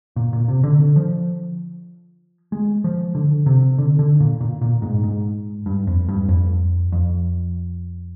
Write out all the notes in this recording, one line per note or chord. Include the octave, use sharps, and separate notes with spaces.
A#2
A#2
C3
D3
F3
G#3
F3
D3
C3
D3
D3
A#2
A#2
A#2
G#2
G#2
G2
F2
G2
F2
F2